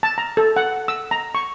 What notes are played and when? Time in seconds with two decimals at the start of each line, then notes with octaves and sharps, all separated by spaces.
0.03 A5
0.18 A#5
0.37 A4
0.56 F#5
0.88 E6
1.11 A#5
1.35 C#6